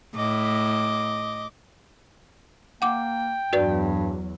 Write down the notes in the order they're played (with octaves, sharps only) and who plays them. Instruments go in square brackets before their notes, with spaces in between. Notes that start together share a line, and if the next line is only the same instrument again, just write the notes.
[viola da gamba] A2 [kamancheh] D#5 D6
[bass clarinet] A#3 [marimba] F#5 D6 [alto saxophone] G5
[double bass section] E2 F#3 [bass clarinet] G2 [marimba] F#4 B4 D5